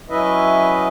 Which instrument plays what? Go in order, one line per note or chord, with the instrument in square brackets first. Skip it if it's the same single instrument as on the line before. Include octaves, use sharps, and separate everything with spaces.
[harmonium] F#3 C#4 E4 B4 D#5 E5